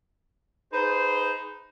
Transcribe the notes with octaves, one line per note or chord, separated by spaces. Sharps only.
D#4 G#4 B4 C5